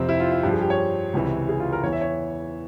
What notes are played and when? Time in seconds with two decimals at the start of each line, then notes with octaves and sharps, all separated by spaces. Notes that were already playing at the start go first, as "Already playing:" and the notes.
Already playing: F2 C3 F3 C4
0.09 E4
0.20 F4
0.32 F4
0.43 G2 F3 G4
0.53 G#4
0.61 G4
0.70 C#5
1.14 C#2 C3 E3
1.49 G#4
1.60 F4
1.73 A#4
1.83 E2 E3 C#5
1.93 E5
2.01 C#5